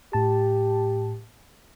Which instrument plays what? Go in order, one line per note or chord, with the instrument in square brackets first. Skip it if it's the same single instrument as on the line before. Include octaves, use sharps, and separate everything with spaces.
[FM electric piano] A2 A5 [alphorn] G4